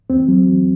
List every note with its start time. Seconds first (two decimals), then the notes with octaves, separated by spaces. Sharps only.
0.10 E2 C4
0.28 F#3
0.48 E2